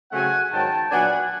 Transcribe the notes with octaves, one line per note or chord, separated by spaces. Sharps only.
C#3 F#3 A3 C4 F#5 G#5
G#2 D#3 F#3 G5 A5
A#2 F#3 B3 D4 F#5 G#5